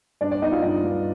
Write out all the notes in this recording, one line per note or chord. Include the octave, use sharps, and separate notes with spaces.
G2 D4 D5
D4 D5
B3 D#4 D#5
F4 F5
G2 D#4 D#5
G2